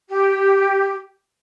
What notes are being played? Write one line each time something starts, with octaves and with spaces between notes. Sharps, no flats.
G4